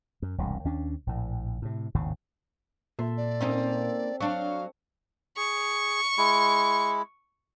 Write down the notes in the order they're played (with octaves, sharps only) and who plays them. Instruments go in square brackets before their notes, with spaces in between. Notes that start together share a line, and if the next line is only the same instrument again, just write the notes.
[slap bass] F#2
E1 C2 G2
D#2 C#4 D4
A#1 A2
A2 C3
G#1 D#2 A2 C#3
[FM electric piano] A#2 [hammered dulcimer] A4 E5 C6
[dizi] D5
[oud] A#3 C#4 D#4 [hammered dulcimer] C4
[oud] F#3 D4 [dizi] F5 [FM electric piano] C#6
[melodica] G#4 [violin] C#6
[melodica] G#3 E4